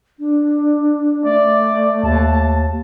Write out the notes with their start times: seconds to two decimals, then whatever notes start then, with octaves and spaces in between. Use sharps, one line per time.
0.19 D4
1.24 A3 D5
2.03 D#2 A5